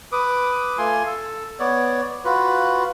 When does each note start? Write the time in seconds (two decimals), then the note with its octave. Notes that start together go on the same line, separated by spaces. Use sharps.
0.12 B4 D6 D#6
0.78 A3 F4 G#5 C6
1.06 A4
1.60 B3 C#5 D5
2.25 F4 F#4 B4